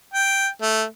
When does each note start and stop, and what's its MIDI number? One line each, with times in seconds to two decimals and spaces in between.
0.14 0.48 79
0.62 0.84 57